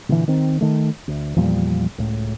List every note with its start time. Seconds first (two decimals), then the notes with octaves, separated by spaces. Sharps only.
0.09 A#2 D3 E3
0.28 D#3 C4
0.61 D#3 A3
1.08 D2
1.36 E2 A#2 F3 G3
1.98 C#2 A2